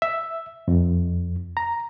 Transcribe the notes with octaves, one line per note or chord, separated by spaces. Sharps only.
E5
F2
A#5